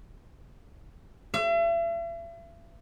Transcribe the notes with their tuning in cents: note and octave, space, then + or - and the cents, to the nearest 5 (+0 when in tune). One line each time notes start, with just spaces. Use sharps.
E5 +40